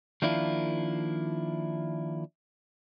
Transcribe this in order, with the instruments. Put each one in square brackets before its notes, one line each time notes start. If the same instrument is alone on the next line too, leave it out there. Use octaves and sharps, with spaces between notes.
[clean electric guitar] D#3 F3 A#3 D4 E4 F4